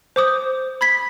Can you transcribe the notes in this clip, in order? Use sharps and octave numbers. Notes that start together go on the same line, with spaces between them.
C5 D6 D#6 G6
B5 G#6 B6